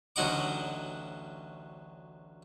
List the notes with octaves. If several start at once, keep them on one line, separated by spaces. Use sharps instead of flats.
A1 D2 F#3 D#4 F#5 D6